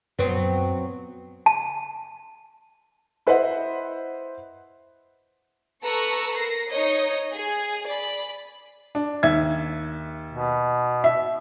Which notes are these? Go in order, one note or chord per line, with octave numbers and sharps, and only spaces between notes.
F#2 A#2 F3 F#3 B3 C4
A5
E4 B4 C5 D#5 E5 F#5
A4 B4 A#5 C#6 E6
A#4 A#6 C7
D#4 C#5 D#5
G#4
D5 B5
D4
D#2 E5 G#6
B2
E5